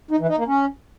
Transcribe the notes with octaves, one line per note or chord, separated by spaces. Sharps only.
D#4
E3
D#4
A#3
C#4